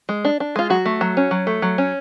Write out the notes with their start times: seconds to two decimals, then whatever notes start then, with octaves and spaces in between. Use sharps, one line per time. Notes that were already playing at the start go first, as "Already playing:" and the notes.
0.09 G#3
0.25 D4
0.40 D4
0.56 G#3 F4
0.70 F#3 F#4
0.85 A3
1.01 F#3
1.17 C#4
1.31 F#3
1.47 A3
1.62 F#3
1.78 C#4